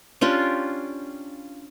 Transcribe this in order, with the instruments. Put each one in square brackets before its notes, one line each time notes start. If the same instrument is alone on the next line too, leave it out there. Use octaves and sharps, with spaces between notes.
[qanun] C#4 D4 F4 G4